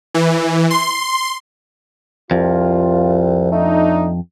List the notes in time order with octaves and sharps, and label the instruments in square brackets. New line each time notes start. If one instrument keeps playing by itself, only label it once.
[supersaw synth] E3
C6
[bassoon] C2 [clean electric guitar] F2 [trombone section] F4
[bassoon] A3 [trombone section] D4 D#4